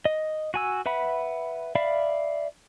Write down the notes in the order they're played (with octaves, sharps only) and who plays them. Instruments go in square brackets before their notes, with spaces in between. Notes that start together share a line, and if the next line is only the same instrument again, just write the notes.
[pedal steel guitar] D#5
F#4 G#5 E6
B4 E5 F#5 B5
D5 E5 F5 B5